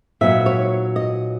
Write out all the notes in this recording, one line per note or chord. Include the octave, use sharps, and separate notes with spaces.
A#2 F#3 B3 D#4 E5
C#5
D#5